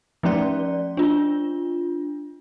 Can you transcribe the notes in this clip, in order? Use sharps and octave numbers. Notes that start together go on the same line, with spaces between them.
F3 A3 C#4 D5
D4 F4